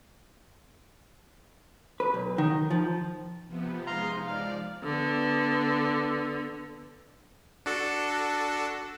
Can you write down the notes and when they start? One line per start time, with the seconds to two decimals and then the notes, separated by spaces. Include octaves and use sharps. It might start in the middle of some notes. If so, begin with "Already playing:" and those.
2.00 B4
2.14 B1
2.38 D#3
2.70 F3
3.48 C3 F3 B3
3.87 G#3 D#4 F5 A#5 C6
4.27 F3 D5 F5
4.84 D3 B3
7.66 D4 F#4 A4